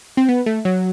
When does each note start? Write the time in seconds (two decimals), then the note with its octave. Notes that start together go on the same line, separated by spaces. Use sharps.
0.17 C4
0.29 B3
0.46 A3
0.65 F#3